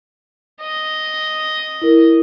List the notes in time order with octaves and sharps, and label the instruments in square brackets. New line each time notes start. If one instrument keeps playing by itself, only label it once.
[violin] D#5
[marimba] E4 A#4